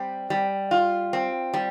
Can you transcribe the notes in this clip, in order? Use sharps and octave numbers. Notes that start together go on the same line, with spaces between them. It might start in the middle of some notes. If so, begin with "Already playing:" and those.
Already playing: G3 C4
G3
F4
C4
G3